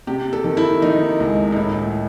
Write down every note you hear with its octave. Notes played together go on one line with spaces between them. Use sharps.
C3 G4
A4
D#3
E4
D#3 D#4
C#2
D#4
A2 E4